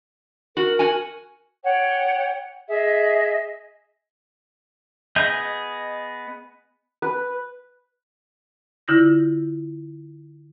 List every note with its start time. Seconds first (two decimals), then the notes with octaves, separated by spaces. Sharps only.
0.57 F#4 A#4
0.79 F#4 G#5
1.64 C#5 F#5 G5
2.69 G#4 D#5 E5
5.16 B3 G#4 D#5 G6
7.02 B4
8.88 D3 E4 F4 D#6 G6 A#6